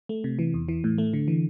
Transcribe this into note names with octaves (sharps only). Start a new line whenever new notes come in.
A3
C3
E3
E2
E3
A2
A3
D3
E3